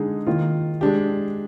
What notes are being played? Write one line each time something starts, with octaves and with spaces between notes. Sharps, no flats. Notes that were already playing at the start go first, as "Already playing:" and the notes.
Already playing: D3 G#3 D#4 G#4
D#3 A#3 F4
G#3 D4 G4